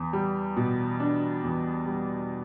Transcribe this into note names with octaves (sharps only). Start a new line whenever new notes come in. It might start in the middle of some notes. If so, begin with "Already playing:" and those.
Already playing: E2
G3
B2
D4
E2
G3